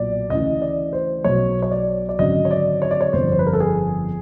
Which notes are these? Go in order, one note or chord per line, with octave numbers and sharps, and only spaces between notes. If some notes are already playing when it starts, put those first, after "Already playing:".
Already playing: B1 A#2 F#3 D5
D2 C#3 E3 D#5
D5
C5
B1 B2 F#3 C#5
C#5
D5
D5
G#1 F#2 D3 F#3 D#5
C#5
D5
C#5
D5
C#5
G1 F2 D3 C5
C5
B4
A#4
A4
G#4